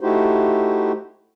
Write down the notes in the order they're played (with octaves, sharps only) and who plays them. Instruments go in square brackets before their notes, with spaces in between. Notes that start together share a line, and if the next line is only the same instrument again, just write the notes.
[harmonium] A3 D#4 E4 F#4 G4 C5